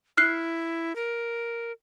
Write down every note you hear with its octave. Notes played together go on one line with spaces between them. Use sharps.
E4 F6 F#6 C7
A#4